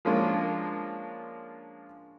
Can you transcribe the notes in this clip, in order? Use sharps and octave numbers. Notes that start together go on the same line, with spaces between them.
F3 G#3 A#3 C#4 D4 F4